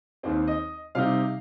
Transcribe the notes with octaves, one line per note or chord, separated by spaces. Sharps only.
D#2 D#3 C4 C5
D#5
C3 G3 D#4 F5